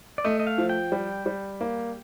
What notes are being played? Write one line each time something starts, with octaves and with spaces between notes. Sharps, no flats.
D5
A3 D#5
D#5
F5
F3
G5
G3
G3
A#3